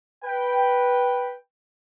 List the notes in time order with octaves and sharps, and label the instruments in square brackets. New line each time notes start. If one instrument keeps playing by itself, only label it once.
[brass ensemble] B4 G5